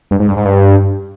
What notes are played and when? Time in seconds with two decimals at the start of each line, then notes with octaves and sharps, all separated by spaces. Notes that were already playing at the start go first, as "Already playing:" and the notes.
0.11 G2
0.20 G#2
0.28 G2
0.37 G#2
0.45 G2